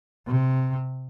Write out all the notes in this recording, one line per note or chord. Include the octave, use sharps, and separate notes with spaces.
C3